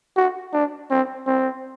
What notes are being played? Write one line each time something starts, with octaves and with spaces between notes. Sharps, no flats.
F#4
D4
C4
C4